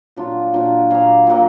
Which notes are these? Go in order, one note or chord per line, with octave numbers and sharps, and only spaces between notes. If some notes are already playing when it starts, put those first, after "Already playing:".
A#2 F#3 D4 F4
A#2 F#3 D4 F4
A#2 F#3 A#3 F5 G#5
A#2 F#3 A#3